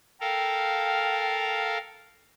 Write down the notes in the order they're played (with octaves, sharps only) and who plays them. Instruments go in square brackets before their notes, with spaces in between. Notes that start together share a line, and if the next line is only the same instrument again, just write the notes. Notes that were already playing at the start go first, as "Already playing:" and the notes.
[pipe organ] A4 A#4 F5 [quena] G5